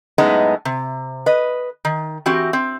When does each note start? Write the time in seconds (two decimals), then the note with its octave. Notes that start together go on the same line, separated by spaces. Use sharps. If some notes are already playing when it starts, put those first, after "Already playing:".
0.18 F#2 A2 G#3 B3 D#4
0.65 C3
1.26 B4 D#5
1.85 D#3
2.26 E3 C4 F#4 G4
2.53 C4